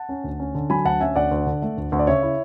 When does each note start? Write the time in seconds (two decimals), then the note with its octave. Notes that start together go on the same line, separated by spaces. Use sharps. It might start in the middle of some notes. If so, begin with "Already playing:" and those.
Already playing: F#5 A5
0.09 C#4
0.24 D2
0.40 C#4
0.55 D3
0.70 F#3 G#5 B5
0.85 D2 F#5 A5
1.01 C#4 E5 G#5
1.16 D2 D5 F#5
1.31 D2
1.46 D3
1.62 A3
1.77 D2
1.92 D2
1.99 D5
2.07 C#3 C#5 E5
2.23 E4